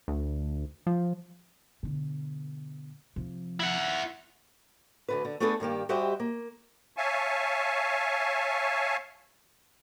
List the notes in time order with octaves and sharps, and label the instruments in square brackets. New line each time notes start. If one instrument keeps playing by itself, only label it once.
[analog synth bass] D2
F3
[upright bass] B2 D3
C3 F3
[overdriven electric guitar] E4 F#5
[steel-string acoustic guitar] D2 D3 B4
D3
A3 B3 D4 G#4 A4 B4
G2 D#3 A#3 G4
G3 F#4 G4 C5 D#5 E5
A#3
[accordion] C#5 E5 F5 G#5 A5 C#6